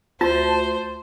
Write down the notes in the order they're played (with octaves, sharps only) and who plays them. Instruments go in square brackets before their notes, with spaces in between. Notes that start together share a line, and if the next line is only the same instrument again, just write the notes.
[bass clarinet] D2 [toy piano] F4 [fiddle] C5 [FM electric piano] A5